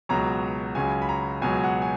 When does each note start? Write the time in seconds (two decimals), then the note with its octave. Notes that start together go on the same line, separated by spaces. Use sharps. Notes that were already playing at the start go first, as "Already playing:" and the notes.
0.09 C#2 B2 F#3 A#5
0.75 C#2 C#3 F#3 G#5
1.02 B5
1.09 A#5
1.42 C#2 B2 F#3 G#5
1.64 F#5
1.82 G#5